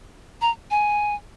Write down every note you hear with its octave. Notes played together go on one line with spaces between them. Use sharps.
A#5
G#5